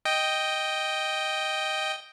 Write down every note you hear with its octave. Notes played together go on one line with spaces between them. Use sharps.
D#5 G5